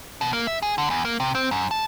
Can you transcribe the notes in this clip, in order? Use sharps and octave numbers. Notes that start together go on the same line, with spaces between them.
B2
A#3
E5
G#4
D3
E2
A#3
C3
C4
F#2
A5